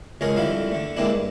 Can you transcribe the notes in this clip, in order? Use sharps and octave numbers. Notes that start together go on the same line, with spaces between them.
C#2 G#3 C#4 G#4 A#4
F2 D3 G3 E4 F5
D3 A3
G#3 A#3 C4 D4 E4
G2